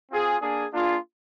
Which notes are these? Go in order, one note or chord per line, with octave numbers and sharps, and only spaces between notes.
C4 F4 G#4
A#3 D4 G#4
A#3 D4 F4 G#4